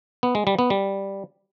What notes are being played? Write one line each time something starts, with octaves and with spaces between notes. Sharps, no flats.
B3
G#3
G3
B3
G3